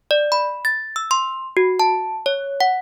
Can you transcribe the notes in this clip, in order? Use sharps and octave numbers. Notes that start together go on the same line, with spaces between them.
D5
B5
A6
E6
C6
F#4
A5
C#5
F#5